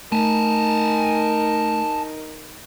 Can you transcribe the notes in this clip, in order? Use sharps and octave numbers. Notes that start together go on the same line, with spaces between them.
A3 D#4 A#4 G#5 A5